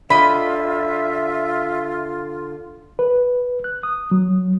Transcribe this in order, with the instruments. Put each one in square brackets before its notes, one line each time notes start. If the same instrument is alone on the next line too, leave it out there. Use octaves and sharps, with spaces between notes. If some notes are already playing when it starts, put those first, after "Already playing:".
[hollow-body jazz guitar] D3 D#5 [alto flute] F4 [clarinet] E5 [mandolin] B5
[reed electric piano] B4
F#6
D#6
F#3